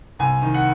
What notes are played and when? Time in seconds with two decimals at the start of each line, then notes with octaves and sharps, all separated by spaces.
0.19 C2 G#5
0.42 D#3
0.54 F#5